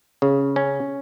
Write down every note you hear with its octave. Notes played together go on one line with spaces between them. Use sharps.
C#3
C#4